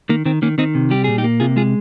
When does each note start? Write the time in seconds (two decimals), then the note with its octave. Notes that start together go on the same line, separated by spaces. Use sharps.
0.09 D#3 A#3
0.26 D#3 C4
0.42 D#3 A#3 C#4
0.58 D#3 C4 D#4
0.75 C3
0.91 G3 G4
1.04 A#2 G#4
1.18 D#4 G4
1.24 A#3
1.40 C3 F4 G#4
1.56 G#3 F4 G#4